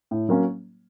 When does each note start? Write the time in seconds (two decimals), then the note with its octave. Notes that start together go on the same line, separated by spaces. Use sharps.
0.11 A2
0.29 F#3 A#3 C#4